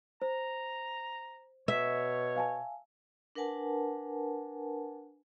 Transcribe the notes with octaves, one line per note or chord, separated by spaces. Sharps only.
C5 A#5
B2 C#5 E5
F5 G#5 A5
D4 A#4 B4 F#5 G#5 A5